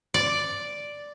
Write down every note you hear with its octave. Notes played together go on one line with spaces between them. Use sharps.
D5